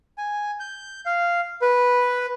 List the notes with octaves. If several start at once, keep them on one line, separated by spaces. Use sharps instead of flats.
G#5
G6
F5
B4